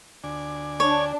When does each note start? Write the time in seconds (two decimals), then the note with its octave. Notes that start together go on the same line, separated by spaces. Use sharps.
0.24 D2 D5 G#5
0.80 D4 C#5